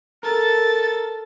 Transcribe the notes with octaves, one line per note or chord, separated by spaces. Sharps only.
A4 A#4 A6